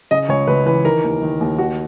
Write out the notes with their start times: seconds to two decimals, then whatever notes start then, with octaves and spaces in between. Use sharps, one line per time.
0.11 C#3 D#5
0.29 C#2 C#5
0.47 C#2 B4
0.66 E3 B4
0.84 D#3 A#4
1.04 D#2
1.22 D#3
1.41 D#2
1.58 D#3 F#4